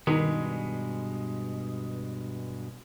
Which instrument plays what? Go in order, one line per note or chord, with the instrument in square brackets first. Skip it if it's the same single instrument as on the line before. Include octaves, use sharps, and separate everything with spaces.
[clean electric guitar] G2 B2 G#3 [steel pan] D#3